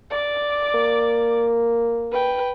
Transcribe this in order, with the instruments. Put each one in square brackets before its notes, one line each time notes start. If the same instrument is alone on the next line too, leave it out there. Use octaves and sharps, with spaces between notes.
[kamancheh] D5 D6
[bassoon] A#3
[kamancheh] B4 G5